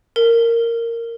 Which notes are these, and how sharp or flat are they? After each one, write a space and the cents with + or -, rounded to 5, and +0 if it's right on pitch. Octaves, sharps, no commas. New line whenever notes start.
A#4 -10